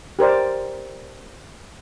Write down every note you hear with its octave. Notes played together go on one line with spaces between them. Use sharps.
G4 A#4 C5 D5